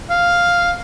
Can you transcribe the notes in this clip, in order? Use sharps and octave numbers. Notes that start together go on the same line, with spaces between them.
F5